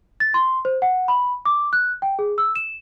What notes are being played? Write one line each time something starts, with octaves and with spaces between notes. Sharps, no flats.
A6
C6
C5
F#5
B5
D6
F#6
G5
G#4
E6
E7